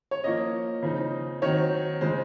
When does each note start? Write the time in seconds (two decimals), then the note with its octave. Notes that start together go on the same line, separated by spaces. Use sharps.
0.11 C#5
0.24 F3 A#3 C#4 D#5
0.83 C#3 F3 C4 D#4
1.42 D#3 F#3 C4 C#5
2.01 C#3 F3 G#3 C5